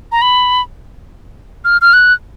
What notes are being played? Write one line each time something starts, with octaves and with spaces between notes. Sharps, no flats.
A#5
B5
F6
F6
F#6